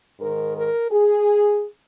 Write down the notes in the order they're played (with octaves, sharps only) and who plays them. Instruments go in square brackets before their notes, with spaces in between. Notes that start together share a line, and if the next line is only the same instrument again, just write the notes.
[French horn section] G#2 D#3 A#4
A#4
G#4